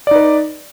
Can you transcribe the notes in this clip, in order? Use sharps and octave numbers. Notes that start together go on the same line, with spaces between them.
D#4 B4 D5